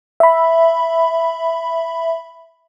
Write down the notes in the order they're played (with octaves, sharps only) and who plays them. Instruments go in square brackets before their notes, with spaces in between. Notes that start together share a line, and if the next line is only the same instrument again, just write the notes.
[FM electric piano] E5 B5